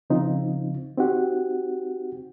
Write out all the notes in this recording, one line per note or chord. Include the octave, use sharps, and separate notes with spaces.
C#3 F3 C4 D#4 F4
C4 D#4 F#4 G4 F#5